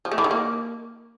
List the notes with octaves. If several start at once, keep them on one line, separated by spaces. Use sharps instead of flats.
F3
A3
E3
D#3
A#3